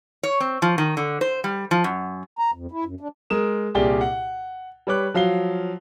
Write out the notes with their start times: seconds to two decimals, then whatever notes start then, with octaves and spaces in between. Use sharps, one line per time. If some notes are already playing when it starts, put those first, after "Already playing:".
0.23 C#5
0.40 C4
0.62 F3
0.78 D#3
0.97 D3
1.21 C5
1.44 G3
1.71 F3
1.84 F#2
2.39 A#5
2.54 F2
2.71 E4
2.85 F#2
3.00 D4
3.30 G#3 A#4 D#6 E7
3.75 C2 A#2 G4 G#4 D5 G7
4.01 F#5
4.87 G3 B4 C#5 D6 F#6
5.14 F3 F#3 F5 C7 G7